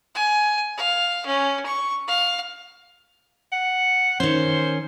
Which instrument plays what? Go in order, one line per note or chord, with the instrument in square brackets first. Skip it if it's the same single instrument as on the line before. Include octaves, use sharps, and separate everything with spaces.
[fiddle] G#5
F5
C#4
C#6
F5
[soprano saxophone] F#5
[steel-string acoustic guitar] D#3 C#4 [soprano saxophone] C5